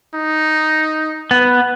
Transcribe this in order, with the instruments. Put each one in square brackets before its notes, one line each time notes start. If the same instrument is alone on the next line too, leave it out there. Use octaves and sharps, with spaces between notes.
[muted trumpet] D#4
[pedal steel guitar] B3